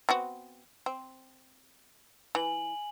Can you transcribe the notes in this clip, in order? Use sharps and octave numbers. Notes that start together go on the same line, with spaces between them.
B3 C4 F#4
C4
E3 G#5 F#7